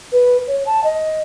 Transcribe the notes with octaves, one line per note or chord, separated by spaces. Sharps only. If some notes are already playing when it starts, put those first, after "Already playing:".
B4
C#5
A5
D#5